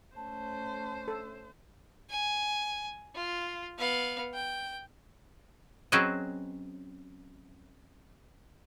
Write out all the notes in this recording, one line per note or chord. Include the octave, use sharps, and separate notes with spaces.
A3 C#4 C5 A5
A4
G#5
F4
B3 F5
G5
F#3 C4 C#4 G#4 B4 D#5